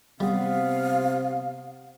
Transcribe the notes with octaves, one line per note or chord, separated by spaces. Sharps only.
C3 G3 B3 F5